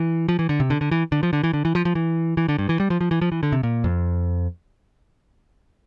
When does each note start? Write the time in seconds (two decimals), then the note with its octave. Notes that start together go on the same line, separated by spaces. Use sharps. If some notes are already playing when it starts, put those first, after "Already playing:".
Already playing: E3
0.29 F3
0.39 E3
0.49 D3
0.60 C3
0.70 D3
0.81 D3
0.91 E3
1.12 D3
1.23 F3
1.33 D3
1.43 E3
1.53 D3
1.65 E3
1.75 F3
1.85 F3
1.95 E3
2.37 E3
2.48 D3
2.58 G2
2.69 E3
2.80 G3
2.90 F3
3.01 F3
3.11 E3
3.21 F3
3.32 E3
3.43 D3
3.52 C3
3.63 A#2
3.84 F2